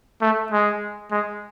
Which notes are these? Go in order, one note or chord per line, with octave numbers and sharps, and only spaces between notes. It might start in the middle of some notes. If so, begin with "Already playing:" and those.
A3
G#3
G#3